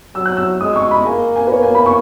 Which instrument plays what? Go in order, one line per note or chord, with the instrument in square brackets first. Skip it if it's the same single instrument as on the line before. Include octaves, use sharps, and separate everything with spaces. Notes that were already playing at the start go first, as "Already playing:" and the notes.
[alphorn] F#3 [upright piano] E6
[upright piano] F#6
E6
[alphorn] G#3 [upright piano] D#6
[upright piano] C#6
B5
[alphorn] A#3 [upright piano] G#5
[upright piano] G#5
B4
[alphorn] A#3 [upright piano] C#5
[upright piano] G#5
B5
C#6